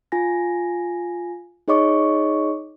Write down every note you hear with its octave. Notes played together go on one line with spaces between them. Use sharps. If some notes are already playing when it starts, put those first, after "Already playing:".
F4 G#5 A#6
D#4 G#4 C#5 D#5 C#6 D6